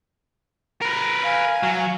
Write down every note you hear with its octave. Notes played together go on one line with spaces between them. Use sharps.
A#4 B4
F5 G#5
F#3